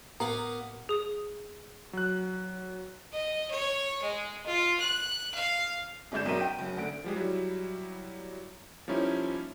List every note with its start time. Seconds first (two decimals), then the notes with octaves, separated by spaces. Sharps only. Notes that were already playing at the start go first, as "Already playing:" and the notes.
0.20 A2 A#3 B3
0.89 G#4 D#6
1.93 F#3 F#6
3.12 D#5
3.50 C#5
4.02 G#3
4.46 F4
4.80 F#6
5.34 F5
6.12 G1 G#3 D5 G6 E7
6.26 B1 F#2 A#4 E5 D#7 E7
6.40 G5
6.59 F#1 F#3
6.77 D2 D3 D7
7.04 F3 G3 G#3
7.16 F#3 G3 E4
8.88 F3 G3 A#3 C#4 D#4 E4